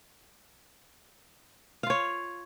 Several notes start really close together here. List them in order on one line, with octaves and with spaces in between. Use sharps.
F5 F4 C#5